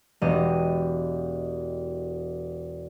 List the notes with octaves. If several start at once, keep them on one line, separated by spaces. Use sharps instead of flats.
E1 B3 G4 D#5 D#7